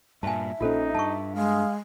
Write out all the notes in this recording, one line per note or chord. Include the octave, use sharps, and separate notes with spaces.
G2 A#2 E5 G#5 A5
A#1 A#2 C#4 D#4 F4 A4 C5
G2 A5 C#6
G#3 F5